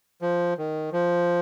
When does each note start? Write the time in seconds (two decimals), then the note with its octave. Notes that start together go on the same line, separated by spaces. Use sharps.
0.22 F3
0.58 D#3
0.92 F3